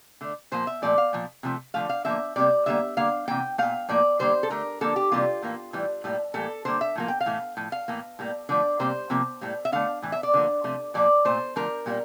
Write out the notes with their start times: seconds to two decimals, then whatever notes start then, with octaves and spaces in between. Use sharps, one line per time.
0.21 D3 A3
0.52 A#2 F3 A#3 C5
0.67 E5
0.82 A#2 F3 A3 D5
0.98 F5
1.13 A#2 F3
1.43 C3 F3 A3
1.74 D3 F3 A3 F5
1.89 F5
2.05 D3 F3 A#3 E5
2.36 C3 G3 A#3 D5
2.66 D3 G3 A#3 E5
2.97 D3 G3 A#3 F5
3.28 C3 E3 A#3 G5
3.58 A#2 A3 F5
3.89 A2 F3 A#3 D5
4.19 D3 G3 A#3 C5
4.43 A4
4.50 D3 A3 A#4
4.81 D3 F3 A#3 A4
4.96 G4
5.12 C3 E3 G3 A#3 F4
5.42 A2 E3 A#3
5.73 A2 E3 G3
6.04 A2 G3 A#3
6.34 A2 E3 G3 A#3 A4
6.65 D3 G3 A#3 C5
6.81 E5
6.96 A2 F3 A#3
7.08 G5
7.21 F5
7.26 A2 E3 A3
7.57 A2 F3
7.72 F5
7.88 A2 E3 A#3
8.19 A2 G3 A#3
8.49 D3 F3 A3 D5
8.80 C3 G3 A#3 C5
9.10 C3 F3 A#3
9.41 A2 G3 A#3
9.65 E5
9.72 D3 A3 F5
10.02 A2 E3
10.12 E5
10.23 D5
10.34 D3 F3 A#3
10.64 C3 F3 A3
10.94 A#2 F3 A#3 D5
11.25 A#2 A3 C5
11.56 D3 F3 A3 A#4
11.86 A#2 G3 A#3